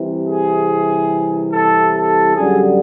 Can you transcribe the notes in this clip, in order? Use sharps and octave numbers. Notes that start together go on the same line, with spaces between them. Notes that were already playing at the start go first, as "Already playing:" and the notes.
Already playing: C2 C3 E3
G#4
A4
A4
F#2 D3 G3 G#4